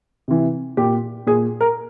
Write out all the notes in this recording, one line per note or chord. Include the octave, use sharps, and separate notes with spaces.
C3 E3
A#2 G4
A#2 G#4
A#4